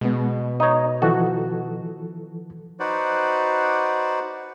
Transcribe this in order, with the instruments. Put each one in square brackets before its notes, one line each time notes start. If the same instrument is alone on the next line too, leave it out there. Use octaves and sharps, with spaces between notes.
[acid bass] B2 [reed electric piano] G#3 B3
[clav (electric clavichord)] D#4 C#5 [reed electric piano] D#5
[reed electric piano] E3 F3 A4 [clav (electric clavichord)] F#4
[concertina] D#4 F#4 B4 C5 D5 F#5